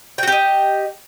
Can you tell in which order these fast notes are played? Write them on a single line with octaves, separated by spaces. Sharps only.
G5 F#4 G4 D#5